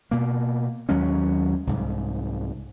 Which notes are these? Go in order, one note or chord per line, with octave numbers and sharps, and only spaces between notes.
B2 A#3
D#2 F#3 G#3 C#4
C2 G#2